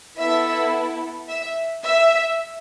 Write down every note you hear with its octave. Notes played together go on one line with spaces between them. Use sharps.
B3 E4 A4 E5
E5
E5